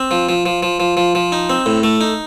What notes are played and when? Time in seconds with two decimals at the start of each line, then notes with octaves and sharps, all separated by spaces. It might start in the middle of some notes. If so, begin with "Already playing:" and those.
Already playing: C4
0.11 F3
0.29 F3
0.46 F3
0.63 F3
0.80 F3
0.97 F3
1.15 F3
1.32 D#4
1.50 C4
1.66 A2
1.83 A3
2.01 D#4